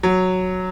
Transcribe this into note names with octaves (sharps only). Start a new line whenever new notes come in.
F#3